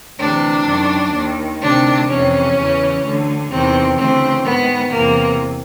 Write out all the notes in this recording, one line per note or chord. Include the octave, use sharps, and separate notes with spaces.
D2 C3 E3 D4
F#2 D#3
D#2 D#3
D2 C3 D#3 D4
F2 C3 E3 C#4
E2 C#3 E3
D2 D3
E2 C3 D#3 C4
D2 C#3 E3 C4
G#2 D#3 B3
E2 C3 E3 A#3